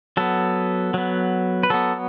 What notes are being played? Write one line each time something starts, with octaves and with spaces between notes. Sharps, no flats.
F#3 B3 A4
F#3 B3
B4
F#3 B3 A4